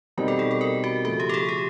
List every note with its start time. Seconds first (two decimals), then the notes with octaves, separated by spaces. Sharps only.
0.17 B2 G3 C4 D#4 A#4
0.28 A4
0.39 G#4
0.51 A4
0.61 A#4
0.84 F#4
1.05 C#3 F3 A3 F#4
1.20 G4
1.29 A4
1.34 G#4
1.49 G4